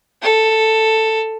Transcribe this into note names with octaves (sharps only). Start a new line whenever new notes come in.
A4